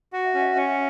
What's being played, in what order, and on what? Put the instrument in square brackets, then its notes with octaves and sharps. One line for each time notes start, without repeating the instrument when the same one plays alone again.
[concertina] F#4 [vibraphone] F#5
[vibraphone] E5
[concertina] C#4 [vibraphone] E5
[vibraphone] D#5
E5
[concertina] C#4 [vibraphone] E5